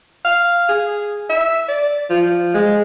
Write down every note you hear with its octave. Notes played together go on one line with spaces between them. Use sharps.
F5
G#4
E5
D5
F3
G#3